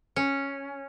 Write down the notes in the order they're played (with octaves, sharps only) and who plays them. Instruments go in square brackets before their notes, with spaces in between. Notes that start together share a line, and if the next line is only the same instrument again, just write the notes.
[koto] C#4